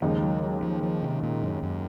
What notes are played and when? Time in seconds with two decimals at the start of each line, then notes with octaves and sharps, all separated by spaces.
0.02 D#2 C#3 F3 G#3 D#4
0.23 F#3
0.42 F#3
0.63 F3
0.83 F3
1.03 C3
1.23 A#2
1.43 F#2
1.63 F#2